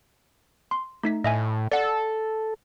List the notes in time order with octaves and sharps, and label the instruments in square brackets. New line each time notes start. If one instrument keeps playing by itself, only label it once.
[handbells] C6
A3 D#4 B6
[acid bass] A2 [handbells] D#5 E5 G#5
[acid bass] A4 [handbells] D5 F#5